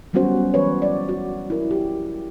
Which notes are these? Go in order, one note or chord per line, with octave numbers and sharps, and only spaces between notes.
F#3 G3 B3 C#4 F#4 C5
E3 B4 C#5
D5
F#4
E4 A#4
G4